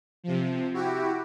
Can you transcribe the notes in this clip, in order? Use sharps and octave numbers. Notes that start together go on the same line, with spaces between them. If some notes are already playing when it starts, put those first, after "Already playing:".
C3 F3
E4 F#4 G4